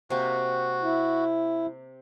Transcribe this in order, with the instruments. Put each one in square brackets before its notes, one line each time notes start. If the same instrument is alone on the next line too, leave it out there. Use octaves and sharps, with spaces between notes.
[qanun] C3 A#3 [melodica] F#4
[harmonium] E4